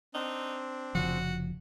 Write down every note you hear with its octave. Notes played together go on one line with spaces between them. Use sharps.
C4 D4 D#4
F1 C#3 F3 F#4